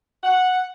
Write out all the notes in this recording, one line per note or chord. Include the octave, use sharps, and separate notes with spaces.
F#5